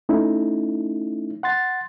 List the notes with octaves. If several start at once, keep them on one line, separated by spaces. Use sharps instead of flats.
A3 C#4 D#4 E4
F#5 C6 A6